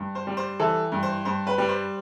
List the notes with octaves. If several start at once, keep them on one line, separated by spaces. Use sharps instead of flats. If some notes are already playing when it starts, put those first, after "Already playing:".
Already playing: G2
C5
G3
C5
E3 A4
G2
C5
G2 C5
B4
G3
C5